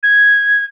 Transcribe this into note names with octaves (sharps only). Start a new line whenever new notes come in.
G#6